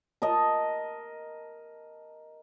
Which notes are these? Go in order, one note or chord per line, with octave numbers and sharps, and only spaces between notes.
A#4 D#5 A5